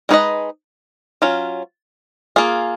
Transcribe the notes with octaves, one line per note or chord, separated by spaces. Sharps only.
G#3 D#4 G#4 B4 D#5
F#3 C#4 F4
A#3 F4 G#4